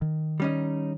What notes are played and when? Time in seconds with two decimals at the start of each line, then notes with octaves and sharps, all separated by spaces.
0.02 D#3
0.40 G3 C#4 D#4